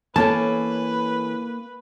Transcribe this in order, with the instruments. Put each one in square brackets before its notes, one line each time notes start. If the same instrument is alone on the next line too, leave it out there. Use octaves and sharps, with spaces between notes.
[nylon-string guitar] E3 C#4 A4 [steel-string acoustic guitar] A#3 [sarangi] B4 [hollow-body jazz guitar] A5